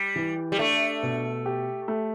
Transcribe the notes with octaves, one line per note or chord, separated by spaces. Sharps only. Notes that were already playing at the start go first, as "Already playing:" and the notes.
Already playing: G3
E3
G3
A3 D4
B2
G4
A3